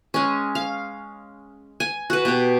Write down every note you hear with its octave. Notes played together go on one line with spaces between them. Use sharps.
G#3 C#4
F5
G#5
F#4 B4
B2 G4